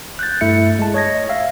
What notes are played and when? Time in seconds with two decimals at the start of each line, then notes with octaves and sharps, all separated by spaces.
0.19 F#6 G6 A6
0.41 G2 A3 E4 E5 C#7
0.79 G#3 A5
0.94 C#5 D#5 G#6 A#6
1.29 E5 F5